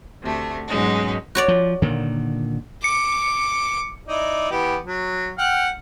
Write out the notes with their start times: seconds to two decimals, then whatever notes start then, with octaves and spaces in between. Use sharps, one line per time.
0.21 D2 C3 A3
0.67 G#2 B2 F#3 G#3 C#4 D#4
1.35 F#4 C#5 D5
1.48 F3
1.82 A#2 D3 D#3
2.84 D6 C#7
4.08 D#4 E4 D5
4.51 E3 B3 G4
4.86 F#3
5.38 F#5 G5 F6